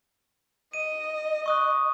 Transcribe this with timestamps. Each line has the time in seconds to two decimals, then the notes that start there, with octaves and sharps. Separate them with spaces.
0.73 D#5 D#7
1.46 C#6 D#6 F#6